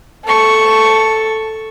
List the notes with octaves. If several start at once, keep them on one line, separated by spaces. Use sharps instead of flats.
A4 C#6